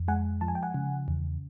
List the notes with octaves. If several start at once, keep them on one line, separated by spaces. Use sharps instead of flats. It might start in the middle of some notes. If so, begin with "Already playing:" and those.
Already playing: F2
G#3 F#5 G#5
F3 A5
G#5
G5
F#5 G#5
C#3
E2